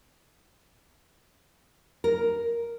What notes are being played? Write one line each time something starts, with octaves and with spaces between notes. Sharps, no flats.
A#4